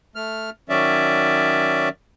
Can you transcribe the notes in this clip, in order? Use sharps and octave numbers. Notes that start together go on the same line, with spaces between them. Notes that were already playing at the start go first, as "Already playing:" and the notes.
A3 F6
D#3 F#3 C#4 D5 E5